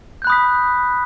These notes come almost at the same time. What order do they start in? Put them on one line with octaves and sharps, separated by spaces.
G6 F#6 B5 D#6 B6